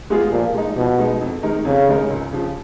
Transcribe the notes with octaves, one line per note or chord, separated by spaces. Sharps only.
G#3 B3 F4 G#4
A#2 F3
G#3 D#4
B2 F3
G#3 D#4
F2
D#3 G#3 D#4 A#4
F2 C#3
D#3 G#3 D#4 A#4
C#2
C#3 F3